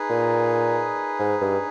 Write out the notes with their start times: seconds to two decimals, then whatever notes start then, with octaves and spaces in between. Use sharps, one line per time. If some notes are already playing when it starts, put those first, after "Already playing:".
Already playing: D#4 G#4 B4
0.10 A#2
1.20 G#2
1.41 G2